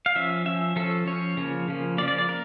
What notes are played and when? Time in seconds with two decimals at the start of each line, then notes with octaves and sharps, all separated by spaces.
0.06 F5
0.15 F3 C#4 E5
0.46 F3 C#4 E5
0.76 F3 C#4 A4
1.06 F3 C#4 C#5
1.37 C#3 F3 A#3
1.68 C#3 F3 A#3
1.98 C#3 F3 A#3 D5
2.08 D5
2.19 D5
2.28 A#3 A#4